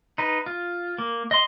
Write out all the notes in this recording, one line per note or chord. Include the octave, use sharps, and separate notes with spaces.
D#4 B4
F4
A#3
D#5 C6